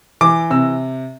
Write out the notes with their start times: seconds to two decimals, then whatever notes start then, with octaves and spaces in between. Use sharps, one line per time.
0.21 E3 D6
0.50 C3 E6